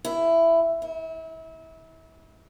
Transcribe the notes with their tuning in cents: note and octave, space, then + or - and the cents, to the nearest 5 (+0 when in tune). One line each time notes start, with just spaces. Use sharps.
E4 +10
E4 -30